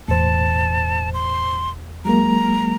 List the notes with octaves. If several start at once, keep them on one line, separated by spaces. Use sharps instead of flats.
E1 E2 A2 C5 A5
C6
F#3 G#3 A#3 A#5